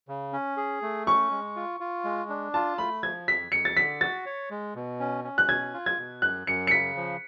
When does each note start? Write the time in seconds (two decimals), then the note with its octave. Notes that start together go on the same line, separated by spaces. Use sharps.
0.08 C#3
0.33 C#4
0.57 G#4
0.82 A3
1.06 C#4 C#6
1.31 G#3
1.56 F4
1.80 F4
2.04 G#3
2.30 D4
2.54 F4 A5
2.78 A3 B5
3.03 F3 G#6
3.28 F2 B6
3.52 F2 C#7
3.65 A6
3.77 D3 B6
4.01 F#4 A6
4.26 C#5
4.51 G#3
4.75 B2
5.00 C#4
5.24 C#4
5.38 F#6
5.49 B2 G#6
5.74 F4
5.86 G#6
5.98 B2
6.22 F#2 F#6
6.47 F#2 C#7
6.67 C#7
6.71 C#3 B6
6.97 F3